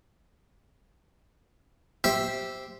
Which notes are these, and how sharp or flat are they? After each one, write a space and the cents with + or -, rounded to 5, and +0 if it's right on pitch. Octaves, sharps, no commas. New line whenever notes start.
G4 -5 C5 +0 E5 +0